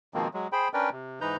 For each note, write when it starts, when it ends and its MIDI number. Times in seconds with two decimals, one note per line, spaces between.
0.14 0.28 47
0.14 0.28 51
0.14 0.28 53
0.14 0.28 56
0.14 0.28 58
0.14 0.28 60
0.34 0.48 54
0.34 0.48 56
0.52 0.68 68
0.52 0.68 72
0.52 0.68 79
0.52 0.68 83
0.74 0.90 61
0.74 0.90 62
0.74 0.90 70
0.74 0.90 71
0.74 0.90 74
0.74 0.90 79
0.92 1.20 48
1.21 1.36 44
1.21 1.36 52
1.21 1.36 63
1.21 1.36 71
1.21 1.36 82
1.21 1.36 91